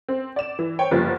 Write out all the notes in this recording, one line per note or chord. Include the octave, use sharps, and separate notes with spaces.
C4
D5 E7
E3
C5 C#5 G5
F#1 F3 G3 B3 A6